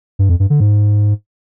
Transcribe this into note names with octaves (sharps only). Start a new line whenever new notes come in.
G2
F2
G2
D3
G#2